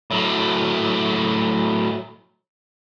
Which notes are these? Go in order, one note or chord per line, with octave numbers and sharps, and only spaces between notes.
A2 F#3